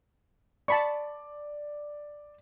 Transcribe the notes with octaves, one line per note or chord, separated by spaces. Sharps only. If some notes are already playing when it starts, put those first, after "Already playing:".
D5 A5 B5 C#6